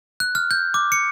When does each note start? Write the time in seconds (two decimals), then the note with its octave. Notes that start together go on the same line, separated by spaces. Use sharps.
0.20 F#6
0.35 F6
0.51 G6
0.74 D6
0.92 C#7